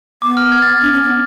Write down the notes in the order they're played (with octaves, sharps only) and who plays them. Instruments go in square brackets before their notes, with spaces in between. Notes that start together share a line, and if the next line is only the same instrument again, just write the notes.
[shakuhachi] B3 [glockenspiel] D6
[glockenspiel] F6
G#6
A6
A6
[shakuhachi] D4
C#4
B3